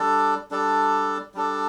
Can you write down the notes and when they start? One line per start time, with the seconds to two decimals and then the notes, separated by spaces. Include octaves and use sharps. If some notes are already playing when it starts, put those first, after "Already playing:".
Already playing: G3 D4 A4 D5
0.51 G3 D4 A4 D5
1.34 G3 D4 A4 D5